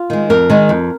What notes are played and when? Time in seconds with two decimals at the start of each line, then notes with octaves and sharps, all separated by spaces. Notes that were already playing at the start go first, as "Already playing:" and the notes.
Already playing: F4
0.10 D#3 G#3
0.30 F2 A#4
0.50 D#3 G#3
0.69 F2